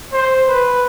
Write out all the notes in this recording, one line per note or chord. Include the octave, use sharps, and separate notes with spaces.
C5
B4